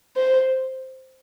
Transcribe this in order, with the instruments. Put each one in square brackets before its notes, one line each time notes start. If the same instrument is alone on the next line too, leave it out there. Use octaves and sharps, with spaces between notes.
[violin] C5